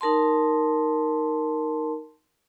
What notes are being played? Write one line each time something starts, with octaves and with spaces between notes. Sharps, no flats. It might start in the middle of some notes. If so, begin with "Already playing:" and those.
D#4 A#4 A5 C6